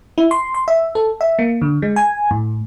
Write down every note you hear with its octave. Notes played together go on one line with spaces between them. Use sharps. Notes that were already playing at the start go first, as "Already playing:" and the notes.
E4
C6
C6
E5
A4
E5
A#3
D3
G#3
G#5
A2